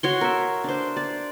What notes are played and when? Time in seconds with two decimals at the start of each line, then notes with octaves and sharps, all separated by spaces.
0.03 F#4 C#5 C6
0.21 A#4 E5
0.64 D4 C5
0.96 D5